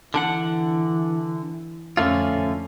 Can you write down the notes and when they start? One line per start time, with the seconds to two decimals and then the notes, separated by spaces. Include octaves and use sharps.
0.14 D3 E3 D4 F#5
1.97 F2 D3 A3 C#4 F4